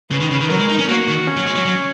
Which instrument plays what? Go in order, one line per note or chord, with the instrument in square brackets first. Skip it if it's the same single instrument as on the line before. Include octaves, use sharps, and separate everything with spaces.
[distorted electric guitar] C#3 [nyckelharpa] B4
[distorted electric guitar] D#3
C#3
D#3
[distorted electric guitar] F#3 [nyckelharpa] A#4
[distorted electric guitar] G#3
D#4
C#4
[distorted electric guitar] A#3 [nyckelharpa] F#4
[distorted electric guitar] D#3
[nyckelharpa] C#4
[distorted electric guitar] F#3
G#3
F#3
F#3